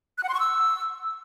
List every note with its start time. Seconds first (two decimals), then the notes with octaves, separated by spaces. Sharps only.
0.18 F#6
0.23 F#5
0.29 C6
0.34 C#6
0.40 E6